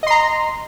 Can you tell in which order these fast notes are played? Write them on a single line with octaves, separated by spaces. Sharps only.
D#5 C6 A#5